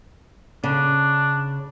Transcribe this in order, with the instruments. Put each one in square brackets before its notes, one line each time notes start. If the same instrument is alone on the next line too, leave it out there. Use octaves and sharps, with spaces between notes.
[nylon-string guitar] C#3 [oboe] D4